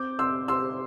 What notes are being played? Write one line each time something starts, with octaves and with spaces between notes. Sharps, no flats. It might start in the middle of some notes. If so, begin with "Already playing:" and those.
Already playing: C4 D6 G6
C3 C6 E6
C3 C6 E6